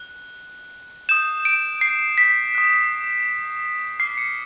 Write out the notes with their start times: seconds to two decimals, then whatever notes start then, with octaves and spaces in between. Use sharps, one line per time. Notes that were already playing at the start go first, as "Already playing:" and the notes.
Already playing: F#6
1.09 D#6 G6 E7
1.45 D7
1.81 C7
2.18 B6
2.55 D#6 F#6
4.00 D6 F6 C7
4.18 C#7